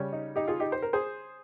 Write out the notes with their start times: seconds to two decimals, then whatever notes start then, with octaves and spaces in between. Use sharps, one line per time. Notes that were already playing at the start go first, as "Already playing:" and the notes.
Already playing: C#3 G3 C#4
0.13 D#4
0.36 D#4 G4
0.48 F4 G#4
0.60 D#4 G4
0.72 C5
0.82 A#4
0.93 G#4 C5